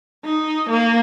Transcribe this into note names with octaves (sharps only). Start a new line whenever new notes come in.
D#4
A#3